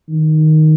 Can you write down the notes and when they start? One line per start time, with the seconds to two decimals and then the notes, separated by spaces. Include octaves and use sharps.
0.09 D#3